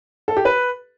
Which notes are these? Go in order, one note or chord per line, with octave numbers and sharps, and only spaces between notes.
A4
G4
B4